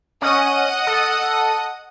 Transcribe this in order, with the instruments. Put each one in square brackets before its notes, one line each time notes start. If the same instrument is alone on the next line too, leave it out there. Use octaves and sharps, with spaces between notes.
[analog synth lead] C#4 [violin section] D#5 F#5 D#6
[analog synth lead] A4